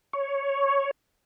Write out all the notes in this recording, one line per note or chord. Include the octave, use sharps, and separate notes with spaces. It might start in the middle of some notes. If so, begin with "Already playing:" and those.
C#5